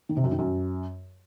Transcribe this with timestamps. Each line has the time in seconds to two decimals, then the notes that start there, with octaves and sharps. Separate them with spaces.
0.09 D#3
0.17 C3
0.24 F#2
0.31 D#3
0.39 F#2